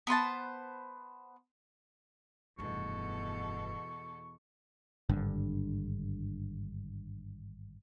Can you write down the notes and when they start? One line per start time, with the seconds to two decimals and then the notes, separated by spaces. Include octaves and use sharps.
0.07 B3 B4 C5 A5
2.59 F1 E2 G2 B2 A4 C#6
5.09 G#1 G2 D3